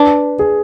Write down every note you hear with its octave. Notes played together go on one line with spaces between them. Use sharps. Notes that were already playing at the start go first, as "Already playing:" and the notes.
Already playing: D4 B4
G#4